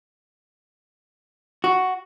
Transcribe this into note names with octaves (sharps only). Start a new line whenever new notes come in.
F#4